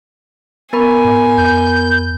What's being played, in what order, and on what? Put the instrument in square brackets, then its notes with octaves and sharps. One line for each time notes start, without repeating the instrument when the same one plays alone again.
[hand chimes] B3 A#4 B5 [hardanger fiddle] G#5
[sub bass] G#2
[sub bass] F2 [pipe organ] G6